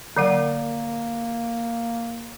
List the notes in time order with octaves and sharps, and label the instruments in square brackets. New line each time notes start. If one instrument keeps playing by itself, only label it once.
[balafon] D3 F#3 F#5 [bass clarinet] A#3